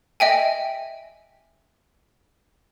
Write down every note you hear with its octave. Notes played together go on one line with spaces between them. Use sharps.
D#5 E5 G5 G#5